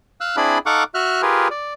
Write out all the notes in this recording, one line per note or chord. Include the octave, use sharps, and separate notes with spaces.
F5 E6 F#6
C4 D4 E4 G#4 D5 B5
D#4 A4 F5 F#5 C#6 D6
F#4 E5 F6 F#6
F4 G4 G#4 A#4 B4
D5